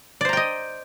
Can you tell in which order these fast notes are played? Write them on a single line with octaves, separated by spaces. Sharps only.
D5 C5 A#5 G5 D#5